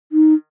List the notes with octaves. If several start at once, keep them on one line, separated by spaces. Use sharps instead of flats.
D#4